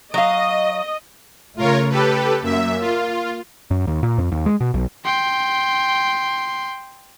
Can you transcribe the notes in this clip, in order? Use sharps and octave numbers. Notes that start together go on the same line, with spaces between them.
F#3 D#5 F5
C#3 A3 F4 A#4 C#5
G4 A4 B4
F#2 A#3 E5
F4
F#2
D#2
A#2
F2
D#2
G#3
B2
B1
G5 C6